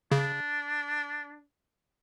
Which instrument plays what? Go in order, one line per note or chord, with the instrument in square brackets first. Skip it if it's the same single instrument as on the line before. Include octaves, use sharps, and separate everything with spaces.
[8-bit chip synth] C#3 [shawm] D4